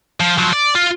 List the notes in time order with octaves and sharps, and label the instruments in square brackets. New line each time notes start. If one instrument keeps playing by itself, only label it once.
[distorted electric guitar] F3
F3 F#3
D5
F4